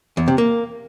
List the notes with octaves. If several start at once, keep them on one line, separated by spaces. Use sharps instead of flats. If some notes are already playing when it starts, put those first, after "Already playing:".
E2
C3
A#3